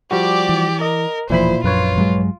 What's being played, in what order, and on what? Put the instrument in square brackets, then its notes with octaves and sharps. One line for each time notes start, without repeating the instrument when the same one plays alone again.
[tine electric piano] F3 G3 F#4 [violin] G4 D5
[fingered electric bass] E3
[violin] A#4 [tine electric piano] D#5
[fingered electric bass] E1 E2 F3 [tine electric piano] A#2 E4 B5 [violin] C5
[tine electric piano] A#1 B4 C#5 [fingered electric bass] F#2 [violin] F4
[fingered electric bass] G2 F#3 G#3